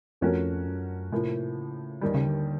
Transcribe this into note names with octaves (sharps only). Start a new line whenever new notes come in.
F2 F3 A3 C#4 F#4 A#4
F#2
A2 C3 F3 A#3
C#3
D#2 D3 D#3 G3
C#3
D3